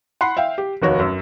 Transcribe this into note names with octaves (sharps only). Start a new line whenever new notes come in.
F#5 B5 C6 C7
E5 F5 G5
G4
F1 D#2 F#4 C#5
F#2